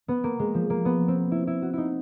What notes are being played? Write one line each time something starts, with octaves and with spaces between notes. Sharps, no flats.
B3
A#3
G#3
F3
A#3
B3
C4
E4
E4
F#4
D#4 E4